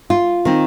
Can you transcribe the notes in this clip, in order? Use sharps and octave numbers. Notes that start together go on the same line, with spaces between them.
F4
D#3 C4